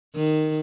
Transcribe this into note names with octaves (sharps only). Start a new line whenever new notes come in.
D#3